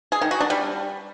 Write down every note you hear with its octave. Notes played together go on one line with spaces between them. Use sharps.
G#4
D#3
F#4
D4
G3